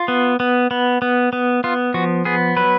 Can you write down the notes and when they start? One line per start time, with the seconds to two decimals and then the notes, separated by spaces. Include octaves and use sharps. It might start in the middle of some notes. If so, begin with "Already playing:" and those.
Already playing: F4
0.08 B3
0.40 B3
0.71 B3
1.02 B3
1.33 B3
1.64 B3 F4
1.94 F3 F#4
2.25 B3 G#4
2.56 F#3 B4